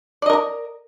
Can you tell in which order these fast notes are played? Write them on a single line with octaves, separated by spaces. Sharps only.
D5 D#5 A#4 A#5